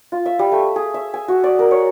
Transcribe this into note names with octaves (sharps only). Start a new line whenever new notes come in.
F4
E5
G3
A3
G#4
E5
G#5
F#4
D5
A#4
C#5